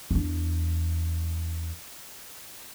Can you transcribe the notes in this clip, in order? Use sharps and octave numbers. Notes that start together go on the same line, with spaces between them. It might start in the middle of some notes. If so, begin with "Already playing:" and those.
E2 D4